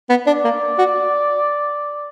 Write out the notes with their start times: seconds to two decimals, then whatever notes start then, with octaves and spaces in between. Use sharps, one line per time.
0.10 B3
0.26 D4 D5
0.44 A#3
0.79 F#4